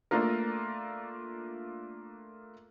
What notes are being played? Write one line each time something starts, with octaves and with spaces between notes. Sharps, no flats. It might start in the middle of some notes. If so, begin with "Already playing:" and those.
A3 A#3 D4 F4 A#4